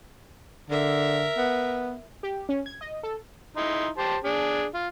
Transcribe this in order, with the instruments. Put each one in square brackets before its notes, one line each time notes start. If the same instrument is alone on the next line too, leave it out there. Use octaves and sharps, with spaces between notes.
[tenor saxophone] D3 [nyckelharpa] A#4 E5
[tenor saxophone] B3
[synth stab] G4
C#4
G#6
D#5
A4
[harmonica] D#4 E4 C6
G4 C5 A5
D4 G#4
F4